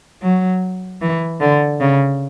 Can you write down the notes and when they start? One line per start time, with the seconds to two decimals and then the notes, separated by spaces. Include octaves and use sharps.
0.22 F#3
1.01 E3
1.40 D3
1.80 C#3